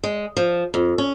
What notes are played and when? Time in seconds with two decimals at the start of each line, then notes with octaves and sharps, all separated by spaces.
0.04 G#3
0.37 F3
0.74 F2
0.98 C#4